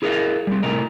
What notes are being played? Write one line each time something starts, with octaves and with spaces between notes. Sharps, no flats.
E4 G#4 A#4 D5 D#5 F5
G3 C4
A2 C3 A#4 D#5